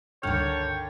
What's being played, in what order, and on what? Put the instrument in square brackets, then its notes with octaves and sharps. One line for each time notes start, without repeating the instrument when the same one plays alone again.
[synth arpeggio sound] C#2 G2 F6 [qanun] D3 D#3 [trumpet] C#5 [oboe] G5